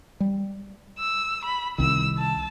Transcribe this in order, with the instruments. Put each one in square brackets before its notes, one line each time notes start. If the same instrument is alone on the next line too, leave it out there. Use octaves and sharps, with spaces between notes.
[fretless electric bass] G3
[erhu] E6
B5
[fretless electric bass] C2 D#3 [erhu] E6
[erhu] A5